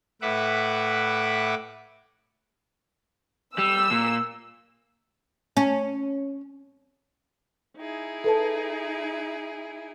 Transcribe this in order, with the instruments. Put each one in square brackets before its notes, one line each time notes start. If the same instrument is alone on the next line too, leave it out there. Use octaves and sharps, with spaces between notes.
[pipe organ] A2 B4 E5 F#5 D6
[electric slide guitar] G3 [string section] E6
[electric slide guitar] A#2
[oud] C#4
[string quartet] D#4 E4 G#4
[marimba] A4 B4 A5